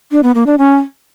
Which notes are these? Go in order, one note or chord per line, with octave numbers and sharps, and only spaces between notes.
D4
B3
A#3
D4
C#4